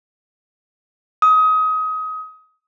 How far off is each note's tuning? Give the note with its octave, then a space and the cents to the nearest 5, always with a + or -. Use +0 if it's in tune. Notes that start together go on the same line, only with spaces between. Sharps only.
D#6 +25